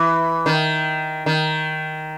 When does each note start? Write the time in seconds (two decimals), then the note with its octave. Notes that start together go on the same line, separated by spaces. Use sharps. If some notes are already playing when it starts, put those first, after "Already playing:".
Already playing: E3
0.46 D#3
1.26 D#3